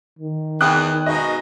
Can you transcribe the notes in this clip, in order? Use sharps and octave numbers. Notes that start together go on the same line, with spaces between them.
D#3
E2 G5 D#6 F#6
G#2 B2 D#5